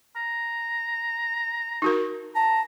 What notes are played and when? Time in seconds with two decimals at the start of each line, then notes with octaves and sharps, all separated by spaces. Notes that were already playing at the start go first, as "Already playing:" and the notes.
0.16 A#5
1.82 D#4 F#4 A#4
2.35 A5 A#5